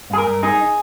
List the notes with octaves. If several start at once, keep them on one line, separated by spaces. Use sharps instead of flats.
G2 G#4
A#4
G2
D#4 G#4